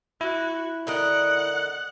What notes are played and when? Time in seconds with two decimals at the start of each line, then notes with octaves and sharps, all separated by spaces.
0.21 E4 F#4
0.87 D3 A#4 D#5 F#5